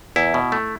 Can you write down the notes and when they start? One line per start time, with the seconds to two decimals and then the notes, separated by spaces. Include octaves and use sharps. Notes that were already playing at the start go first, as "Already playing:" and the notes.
0.16 E2 E4
0.34 B2
0.52 A3